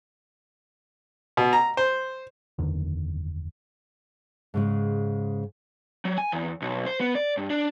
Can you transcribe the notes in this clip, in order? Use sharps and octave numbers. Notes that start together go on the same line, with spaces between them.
B2
A#5
C5
F#1 E2 D3 D#3
G#2 C#3 G#3
F#3
G#5
E2
B1
C5
B3
D5
G2
D4